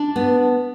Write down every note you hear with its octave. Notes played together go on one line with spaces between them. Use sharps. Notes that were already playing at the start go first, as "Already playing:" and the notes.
Already playing: D4
B3